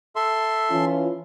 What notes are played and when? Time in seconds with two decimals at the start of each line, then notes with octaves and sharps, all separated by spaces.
0.16 A4 E5 C6
0.70 E3 C#4 F4